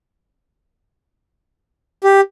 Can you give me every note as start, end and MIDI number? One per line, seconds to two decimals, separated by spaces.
2.04 2.21 67